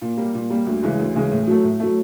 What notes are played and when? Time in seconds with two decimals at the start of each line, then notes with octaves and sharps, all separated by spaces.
0.02 A#2
0.17 G3 A#3
0.35 A#2
0.50 G3 A#3
0.66 D2
0.83 C#3 E3 G#3
0.99 D2
1.15 C#3 E3 G#3
1.32 A2
1.47 F#3 A3
1.64 A2
1.80 F#3 A3